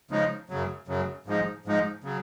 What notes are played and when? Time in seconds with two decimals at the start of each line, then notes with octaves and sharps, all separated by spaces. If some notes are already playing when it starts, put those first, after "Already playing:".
0.11 C#3 F3 G#3 D#4
0.50 F#2 C#3 F#3
0.88 F#2 C#3 F#3
1.26 G#2 F3 G#3 D#4
1.66 G#2 F3 G#3 D#4
2.04 C#3 F#3